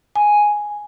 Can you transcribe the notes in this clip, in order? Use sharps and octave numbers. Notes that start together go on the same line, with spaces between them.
G#5